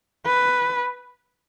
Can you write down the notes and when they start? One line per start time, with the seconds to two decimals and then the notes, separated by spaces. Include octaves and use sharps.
0.26 B4